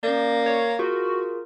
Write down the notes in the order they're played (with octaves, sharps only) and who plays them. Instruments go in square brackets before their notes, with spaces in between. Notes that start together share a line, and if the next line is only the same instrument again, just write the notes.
[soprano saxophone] A#3 [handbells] C#4 D5
[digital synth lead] C#5
[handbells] F4 G#4 A#4 [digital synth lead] F#4